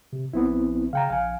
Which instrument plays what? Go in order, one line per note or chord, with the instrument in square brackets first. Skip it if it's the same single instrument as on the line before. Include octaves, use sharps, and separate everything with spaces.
[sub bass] C3
[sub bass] A#1 [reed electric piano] B3 C4 E4
[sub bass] C#3 [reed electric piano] F5 G5 A#5
[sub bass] A#1 [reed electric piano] F5 G#5